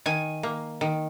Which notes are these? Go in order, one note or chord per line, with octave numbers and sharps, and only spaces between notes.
D#3 G#5
A#3
D#3